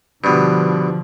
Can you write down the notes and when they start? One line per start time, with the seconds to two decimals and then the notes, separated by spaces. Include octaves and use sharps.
0.24 G2 B2 D3 F3